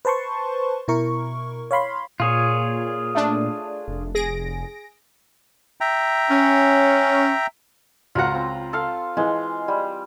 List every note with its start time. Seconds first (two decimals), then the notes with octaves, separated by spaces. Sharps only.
0.05 B4 C5 A5 C6 C#6
0.88 B2 E4 A#4 C#6
1.71 C#5 F5 B5 C6
2.20 A#2 F4 G#4 C#5
3.15 A3 D4
3.88 F1
4.15 G#4 A#6 D7
5.81 E5 G5 A#5
6.30 C#4
8.15 C#2 F4 F#4 F#5 A#5
8.35 C4
8.73 A4 F5
9.17 E3 G#3
9.68 G3